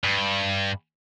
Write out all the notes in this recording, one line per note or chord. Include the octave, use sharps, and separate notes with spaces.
G2